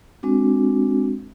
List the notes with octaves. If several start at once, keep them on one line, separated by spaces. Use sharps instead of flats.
G#3 C4 D4 F#4